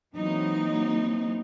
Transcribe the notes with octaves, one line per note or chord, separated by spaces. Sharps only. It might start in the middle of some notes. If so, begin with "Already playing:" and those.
E3 F#3 A#3 C4 D#4